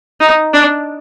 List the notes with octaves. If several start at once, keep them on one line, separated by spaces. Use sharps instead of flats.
D#4
D4